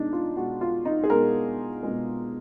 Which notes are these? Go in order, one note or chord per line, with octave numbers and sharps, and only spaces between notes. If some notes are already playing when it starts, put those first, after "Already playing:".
Already playing: B2 G#3 D4 D#4
F4
B2 G#3 F#4
F4
D#4
G#4
B2 G#3 A#4
B2 G#3